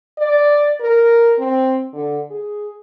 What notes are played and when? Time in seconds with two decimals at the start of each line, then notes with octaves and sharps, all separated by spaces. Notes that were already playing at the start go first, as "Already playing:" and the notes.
0.18 D5
0.80 A#4
1.38 C4
1.93 D3
2.31 G#4